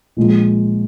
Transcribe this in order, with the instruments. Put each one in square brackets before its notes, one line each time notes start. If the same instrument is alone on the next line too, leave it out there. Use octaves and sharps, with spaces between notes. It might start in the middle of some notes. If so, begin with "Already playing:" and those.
[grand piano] A#2 F3 G#3